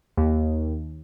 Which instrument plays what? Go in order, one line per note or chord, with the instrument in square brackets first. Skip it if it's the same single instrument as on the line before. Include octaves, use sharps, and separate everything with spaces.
[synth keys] D#2